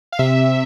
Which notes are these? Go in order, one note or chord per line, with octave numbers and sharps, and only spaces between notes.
F5
C3 E5